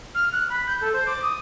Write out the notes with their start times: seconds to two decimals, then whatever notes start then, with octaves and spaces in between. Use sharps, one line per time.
0.15 F6
0.32 F#6
0.50 B5
0.67 G6
0.81 A4
0.93 C5
1.07 D6
1.22 D#6